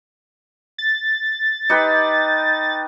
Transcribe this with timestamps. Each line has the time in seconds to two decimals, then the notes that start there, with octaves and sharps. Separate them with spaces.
0.78 A6
1.69 D#4 G4 B4